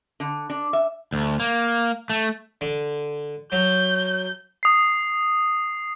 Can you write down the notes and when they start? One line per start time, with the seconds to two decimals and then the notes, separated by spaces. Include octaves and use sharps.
0.20 D3
0.50 D4
0.73 E5
1.12 D2
1.40 A#3
2.10 A3
2.61 D3
3.52 F#3 G6
4.63 D#6 C7